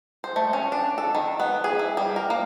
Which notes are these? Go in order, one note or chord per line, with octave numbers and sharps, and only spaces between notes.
C5
A3
C#4
D4
A4
D#3
B3
G#4
E4
G3
A#4
A#3